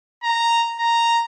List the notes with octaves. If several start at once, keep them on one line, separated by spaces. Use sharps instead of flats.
A#5
A#5